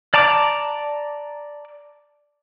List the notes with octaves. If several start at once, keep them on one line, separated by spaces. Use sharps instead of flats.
D5 A5 A#5 D6